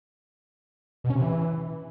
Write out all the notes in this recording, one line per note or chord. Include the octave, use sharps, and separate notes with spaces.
B2
C#4
C3
E3